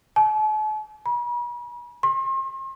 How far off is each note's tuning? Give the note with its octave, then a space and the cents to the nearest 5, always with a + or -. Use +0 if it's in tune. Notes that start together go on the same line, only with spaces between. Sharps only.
A5 -45
B5 -45
C6 +40